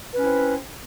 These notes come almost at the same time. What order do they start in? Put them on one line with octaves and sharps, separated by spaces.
B4 C#4 E4 C4